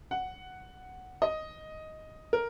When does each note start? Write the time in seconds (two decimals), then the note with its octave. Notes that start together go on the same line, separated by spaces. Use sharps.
0.11 F#5
1.22 D#5
2.33 A#4